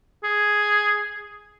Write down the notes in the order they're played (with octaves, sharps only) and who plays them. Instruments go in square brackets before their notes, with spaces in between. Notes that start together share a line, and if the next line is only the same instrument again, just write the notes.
[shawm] G#4